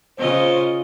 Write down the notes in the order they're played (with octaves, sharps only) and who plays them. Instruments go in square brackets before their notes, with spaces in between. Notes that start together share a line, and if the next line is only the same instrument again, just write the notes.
[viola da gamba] C#3 F4 D#5 [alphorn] C5